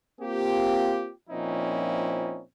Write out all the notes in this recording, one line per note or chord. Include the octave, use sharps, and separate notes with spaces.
A#3 C4 F4 G4
A#2 F3 C4 C#4 D#4 E4